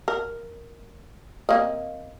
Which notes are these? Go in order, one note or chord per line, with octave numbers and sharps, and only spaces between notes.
A#4
A#3 C4 D#5